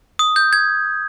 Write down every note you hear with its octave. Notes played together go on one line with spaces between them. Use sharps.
D#6
G6
G#6